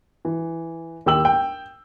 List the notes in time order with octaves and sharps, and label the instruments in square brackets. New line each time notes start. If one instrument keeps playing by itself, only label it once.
[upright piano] E3
D#2 G4 G5 E6 F#7
G5